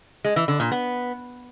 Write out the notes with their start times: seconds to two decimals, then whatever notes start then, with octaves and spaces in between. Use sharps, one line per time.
0.24 G#3
0.36 E3
0.48 D3
0.60 A#2
0.72 B3